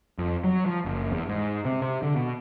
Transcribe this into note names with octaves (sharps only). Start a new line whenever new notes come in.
F2
F#3
F3
F#1
E2
G#2
C3
C3
D3
B2